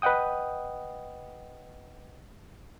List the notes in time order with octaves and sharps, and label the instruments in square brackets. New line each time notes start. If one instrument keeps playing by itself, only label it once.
[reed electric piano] B4 D#5 F#5 G5 D#6